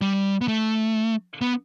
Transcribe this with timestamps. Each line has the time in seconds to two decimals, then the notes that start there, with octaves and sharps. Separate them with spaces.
0.01 G3
0.41 B3
0.48 A3
1.41 B3